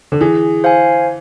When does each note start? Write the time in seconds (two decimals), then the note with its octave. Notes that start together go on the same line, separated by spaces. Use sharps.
0.12 D3
0.21 E3 G#4
0.64 C5 F5 G#5